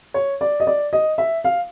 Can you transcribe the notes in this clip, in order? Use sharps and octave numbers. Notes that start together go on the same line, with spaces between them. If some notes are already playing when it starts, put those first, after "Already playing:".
C#5
D5
D#5
D5
D#5
E5
F5